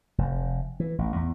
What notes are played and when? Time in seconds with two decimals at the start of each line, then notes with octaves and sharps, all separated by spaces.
0.18 F1
0.80 E3
0.98 A1
1.16 E2